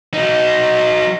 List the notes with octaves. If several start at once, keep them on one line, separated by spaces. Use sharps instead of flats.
F#3 D#4